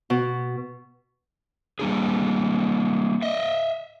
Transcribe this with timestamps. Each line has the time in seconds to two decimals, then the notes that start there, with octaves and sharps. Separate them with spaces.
0.10 B2
1.79 G3 A#3 D4 G#4
3.22 D#5 E5